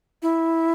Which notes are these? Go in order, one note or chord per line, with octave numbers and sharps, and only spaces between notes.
E4